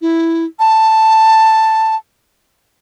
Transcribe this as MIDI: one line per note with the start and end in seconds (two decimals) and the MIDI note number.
0.01 0.45 64
0.59 1.96 81